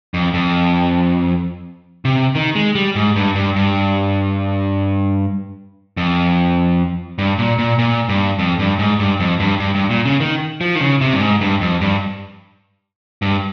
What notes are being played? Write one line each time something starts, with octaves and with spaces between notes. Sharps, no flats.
F2
F2
C3
D#3
G#3
G3
G#2
G2
G2
G2
F2
G2
A#2
A#2
A#2
G2
F2
G2
G#2
G2
F2
G2
G2
G2
A#2
C#3
D#3
F3
D#3
C#3
C3
G2
G#2
G2
F2
G2
G2